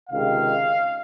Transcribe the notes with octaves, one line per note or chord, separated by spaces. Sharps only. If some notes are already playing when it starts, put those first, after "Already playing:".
C#2 C3 D#3 F5